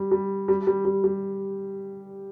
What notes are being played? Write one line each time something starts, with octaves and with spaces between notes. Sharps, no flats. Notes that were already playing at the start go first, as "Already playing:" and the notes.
Already playing: G3
G3
G3
G3
G3
G3